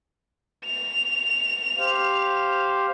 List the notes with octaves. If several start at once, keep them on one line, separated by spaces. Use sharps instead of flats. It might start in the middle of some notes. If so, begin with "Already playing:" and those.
F7
G4 C5 F5